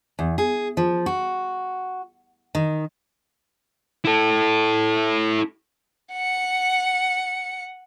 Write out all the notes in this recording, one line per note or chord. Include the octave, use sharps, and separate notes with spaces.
E2
G#4
F3
F#4
D#3
E4 A4
F#5 C#7